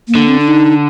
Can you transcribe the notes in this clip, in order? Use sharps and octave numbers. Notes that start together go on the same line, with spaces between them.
A#3
D3
C4
D4
D#4